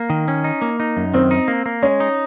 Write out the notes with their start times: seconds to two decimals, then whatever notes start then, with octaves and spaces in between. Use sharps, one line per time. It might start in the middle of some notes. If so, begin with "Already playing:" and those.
Already playing: A#3
0.10 D#3
0.28 C#4
0.44 D#4
0.62 A#3
0.80 D#4
0.97 F#2
1.14 D#3 C4
1.31 D#4
1.48 A#3
1.66 A#3
1.83 G#3 C#4
2.00 D#4